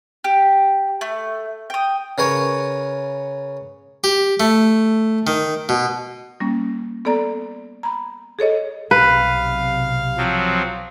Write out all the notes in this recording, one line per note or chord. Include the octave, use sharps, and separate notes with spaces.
G4
A3
G5 D#6
C#3 A#4 B4 C#5
G4
A3
D#3
B2
G3 A#3 C#4
B3 A4 D5 A#5
A#5 B5
G#4 A4 C#5 D#5
B1 C3 B4 F5
F3 F#3 C4